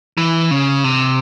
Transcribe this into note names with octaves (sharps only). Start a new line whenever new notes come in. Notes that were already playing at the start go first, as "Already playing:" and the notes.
E3
C#3
C3